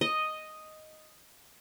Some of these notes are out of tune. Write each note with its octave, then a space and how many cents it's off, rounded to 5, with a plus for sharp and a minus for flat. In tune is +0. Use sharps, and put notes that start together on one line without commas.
D#5 +0